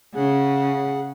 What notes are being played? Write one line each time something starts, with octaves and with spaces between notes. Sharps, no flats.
C#3 G#4 F#5